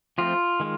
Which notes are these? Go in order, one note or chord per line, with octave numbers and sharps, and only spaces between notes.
F3 A3 C4 F4
D#3 G#3